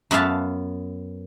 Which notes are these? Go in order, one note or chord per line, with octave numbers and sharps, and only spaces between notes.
F#2 B3 E5 F5 A5